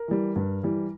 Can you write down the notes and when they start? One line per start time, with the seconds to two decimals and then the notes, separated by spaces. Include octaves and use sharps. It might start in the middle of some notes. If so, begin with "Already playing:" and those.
Already playing: A#4
0.08 E3 G3
0.36 G2
0.63 E3 G3